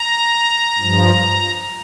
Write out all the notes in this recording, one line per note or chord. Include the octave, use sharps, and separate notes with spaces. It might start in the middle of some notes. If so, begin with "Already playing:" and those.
Already playing: A#5
G2 F3